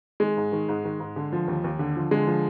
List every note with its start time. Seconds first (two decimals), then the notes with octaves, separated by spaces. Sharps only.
0.20 D#3 G#3
0.37 G#2
0.52 D#3
0.68 G#2
0.84 D#3
1.00 G#2
1.16 D3
1.32 F3
1.48 D#2
1.64 D#2
1.79 D3
1.96 F3
2.11 D3 G#3
2.27 F3